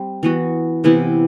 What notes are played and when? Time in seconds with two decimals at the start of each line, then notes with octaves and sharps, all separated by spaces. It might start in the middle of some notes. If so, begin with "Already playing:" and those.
Already playing: G3 C4
0.23 E3 B3 F#4
0.84 C3 E3 B3 E4